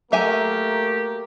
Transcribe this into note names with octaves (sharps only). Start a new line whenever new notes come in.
F#3 A3 A#3 G4 A#4 E5 G#5